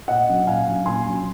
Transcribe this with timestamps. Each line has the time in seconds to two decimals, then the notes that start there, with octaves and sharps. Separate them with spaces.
0.08 A#2 D#5 F#5
0.28 F#3 C#4
0.47 A#2 F5 G#5
0.67 F#3 C#4
0.86 A#2 G#5 C6
1.06 F#3 C#4